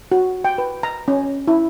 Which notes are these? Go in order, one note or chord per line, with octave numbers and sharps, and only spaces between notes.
F#4
G5
B4
A#5
C#4
E4